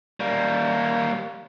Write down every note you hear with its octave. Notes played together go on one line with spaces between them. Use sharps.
G3 A#3